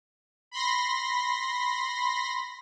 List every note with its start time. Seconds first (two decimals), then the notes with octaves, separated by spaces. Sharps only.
0.51 B5 C6 A#6